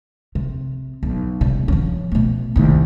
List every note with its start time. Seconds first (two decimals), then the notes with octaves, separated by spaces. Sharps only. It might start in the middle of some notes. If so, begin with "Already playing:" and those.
0.35 C3
1.03 B1
1.41 C3 G3
1.68 F3 C#4
2.12 B2 A3
2.56 C2 D#3